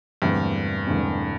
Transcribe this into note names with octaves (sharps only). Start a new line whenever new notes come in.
E1 E2 G2 D3 A3 C4
E1 E2 D3 A3 C4